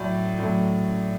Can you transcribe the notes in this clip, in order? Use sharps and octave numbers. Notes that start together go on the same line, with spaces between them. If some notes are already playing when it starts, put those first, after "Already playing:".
Already playing: A2 F#3 A3 D5
A2 F#3 A3